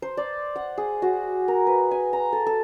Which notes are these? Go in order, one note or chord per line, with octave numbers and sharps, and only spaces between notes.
C5
D5
F#5
G#4
F#4
A#4
B4
G#5
A#5
A4
A4